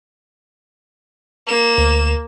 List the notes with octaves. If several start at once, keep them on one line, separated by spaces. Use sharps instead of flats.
A#3 E7
D2